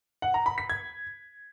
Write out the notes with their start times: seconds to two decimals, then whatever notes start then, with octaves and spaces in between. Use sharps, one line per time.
0.22 F#5
0.34 A#5
0.46 B5
0.58 B6
0.70 G#6